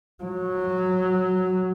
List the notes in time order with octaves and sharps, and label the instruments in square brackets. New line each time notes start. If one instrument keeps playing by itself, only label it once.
[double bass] F#3